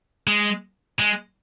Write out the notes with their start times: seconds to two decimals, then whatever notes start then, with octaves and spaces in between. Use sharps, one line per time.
0.27 G#3
0.99 G#3